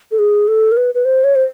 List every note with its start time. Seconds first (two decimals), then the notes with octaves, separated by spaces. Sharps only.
0.11 A4
0.19 G#4
0.48 A4
0.72 A#4
0.77 B4
0.94 B4
1.05 C5
1.24 C#5
1.35 C5